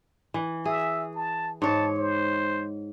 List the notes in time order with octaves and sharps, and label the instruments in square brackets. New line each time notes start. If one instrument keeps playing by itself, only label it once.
[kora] E3
[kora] G#4 [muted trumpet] E5
[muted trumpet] A5
[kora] G#2 C#5 [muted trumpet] A5
[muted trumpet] C5